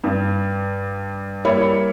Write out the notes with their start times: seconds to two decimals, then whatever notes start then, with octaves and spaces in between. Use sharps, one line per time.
0.04 G2
1.45 G3 A#3 E4 C#5